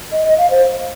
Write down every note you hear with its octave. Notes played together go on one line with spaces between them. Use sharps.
D#5
D#5
F5
C5